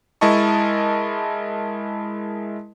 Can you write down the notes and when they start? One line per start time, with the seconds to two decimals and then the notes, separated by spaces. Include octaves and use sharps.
0.21 G#3 E4 A#4 D#5 A5 C#6